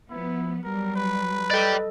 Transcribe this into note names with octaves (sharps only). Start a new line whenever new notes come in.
F3 B3 E4
F#3 G3 A#4
B4
A4 D5 D#5 G5